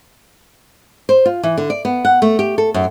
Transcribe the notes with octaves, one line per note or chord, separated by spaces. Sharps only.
C5
F4
E3
D3
D5
B3
F#5
A3
G4
A4
F#2